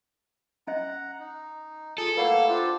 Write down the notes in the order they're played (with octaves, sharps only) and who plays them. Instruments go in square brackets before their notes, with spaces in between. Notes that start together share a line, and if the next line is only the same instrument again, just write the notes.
[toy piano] C#4 D#5 [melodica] F#5 A#5
[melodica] D#4
[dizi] F4 [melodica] G#4 [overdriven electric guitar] A4
[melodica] A3 A#3 E4 [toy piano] B4 D5 F#5 [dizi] F5
[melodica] D4 G4 C5 [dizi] F4